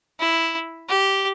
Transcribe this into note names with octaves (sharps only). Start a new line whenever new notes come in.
E4
G4